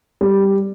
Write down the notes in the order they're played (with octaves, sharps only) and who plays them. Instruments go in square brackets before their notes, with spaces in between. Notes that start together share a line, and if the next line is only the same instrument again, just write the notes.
[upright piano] G3